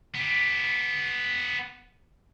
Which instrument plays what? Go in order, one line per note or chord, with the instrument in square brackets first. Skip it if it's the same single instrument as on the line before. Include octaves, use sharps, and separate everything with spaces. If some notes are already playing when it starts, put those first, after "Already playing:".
[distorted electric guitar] B3 G4